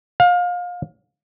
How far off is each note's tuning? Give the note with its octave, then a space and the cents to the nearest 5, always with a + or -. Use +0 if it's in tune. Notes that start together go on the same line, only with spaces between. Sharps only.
F5 +30